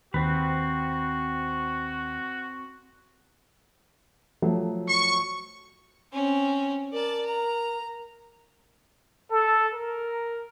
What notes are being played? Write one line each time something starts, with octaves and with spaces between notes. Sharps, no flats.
D#2 C4 F#4 B4
F3 F#3 A3
C#6
C4 C#4
A#4 D5 A5
A#5
A4
A#4